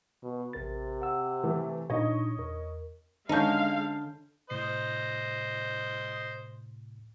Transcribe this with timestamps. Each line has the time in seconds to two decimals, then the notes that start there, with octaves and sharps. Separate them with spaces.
0.23 B2
0.53 A1 C3 A#4 A6
1.02 F#5 E6
1.44 E3 A3
1.90 A#2 D4 D#4 C#5 D#5
2.38 E2 A#4
3.29 D3 G#3 C#4 D#4 F5 A5 G6
4.50 A2 C3 C5 D#5 C7